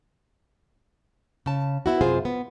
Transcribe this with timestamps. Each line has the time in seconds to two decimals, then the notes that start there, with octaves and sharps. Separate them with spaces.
1.46 C#3 A5
1.86 B3 E4 F#4
2.01 F#2 C3 F4 G#4 C5
2.25 B3